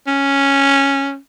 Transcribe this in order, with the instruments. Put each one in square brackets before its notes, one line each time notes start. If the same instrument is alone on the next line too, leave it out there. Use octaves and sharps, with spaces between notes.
[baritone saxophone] C#4